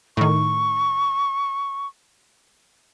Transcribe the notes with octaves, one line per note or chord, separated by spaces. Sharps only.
A2 D#3 C#6